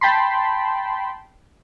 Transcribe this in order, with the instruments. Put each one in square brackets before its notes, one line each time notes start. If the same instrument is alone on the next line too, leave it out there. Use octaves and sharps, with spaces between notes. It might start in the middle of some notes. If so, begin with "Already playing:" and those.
[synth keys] G5 A5 B5 C6